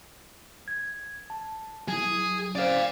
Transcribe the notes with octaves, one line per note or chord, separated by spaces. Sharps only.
G#6
A5
F#3 E4 G#4
C#4 C5 D5 F5